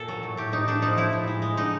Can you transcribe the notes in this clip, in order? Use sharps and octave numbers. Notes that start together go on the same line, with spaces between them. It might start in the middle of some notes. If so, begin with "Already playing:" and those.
Already playing: A#2 A4
F#3
A2
A2 G4
A2 D#4
A2 D4
F3 D#4
A2 E4
A2
G#3
G#3
D3 D#4